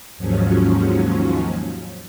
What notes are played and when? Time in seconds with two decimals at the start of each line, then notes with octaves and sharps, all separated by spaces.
0.17 D#2 G#2 F3 F#3 C#4